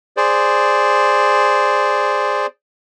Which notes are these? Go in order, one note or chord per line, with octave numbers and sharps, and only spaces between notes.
G#4 C5 D5